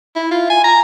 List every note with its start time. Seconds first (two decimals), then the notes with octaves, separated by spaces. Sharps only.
0.16 E4
0.31 F4
0.50 G#5
0.64 A#5